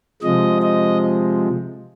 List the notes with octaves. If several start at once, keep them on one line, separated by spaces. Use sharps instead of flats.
C3 F3 G#3 D#5
D#5